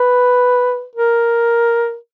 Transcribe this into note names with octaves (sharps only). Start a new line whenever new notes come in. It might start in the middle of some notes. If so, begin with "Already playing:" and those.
Already playing: B4
A#4